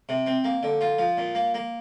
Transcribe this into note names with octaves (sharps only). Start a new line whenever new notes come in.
C3
C4
A#3
D3
F4
F3
A#2
A#3
A#3